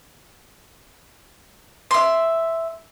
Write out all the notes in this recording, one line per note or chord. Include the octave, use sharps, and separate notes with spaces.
E5 C6